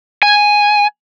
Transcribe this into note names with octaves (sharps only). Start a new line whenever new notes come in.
G#5